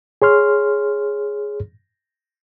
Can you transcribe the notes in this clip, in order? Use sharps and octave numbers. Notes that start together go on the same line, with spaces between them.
G#4 C#5 C6 F6